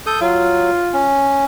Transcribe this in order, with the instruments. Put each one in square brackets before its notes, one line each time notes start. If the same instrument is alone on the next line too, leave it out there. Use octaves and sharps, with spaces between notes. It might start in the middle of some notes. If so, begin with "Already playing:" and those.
[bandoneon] A4 D#6 G6
[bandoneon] F#3 [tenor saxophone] F4
[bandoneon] C#4